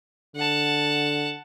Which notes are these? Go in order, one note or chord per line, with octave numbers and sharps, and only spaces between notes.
D3 F#5 A5